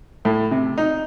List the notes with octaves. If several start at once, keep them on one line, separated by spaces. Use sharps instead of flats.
A2
C3
D#4